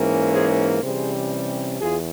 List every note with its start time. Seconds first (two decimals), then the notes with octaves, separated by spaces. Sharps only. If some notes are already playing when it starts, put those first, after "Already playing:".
Already playing: G#2 E3 A#3 C#4
0.32 G#4 C5
0.81 C3 E3 G3 C#4 G#4 C5
1.80 E2 F4 G#4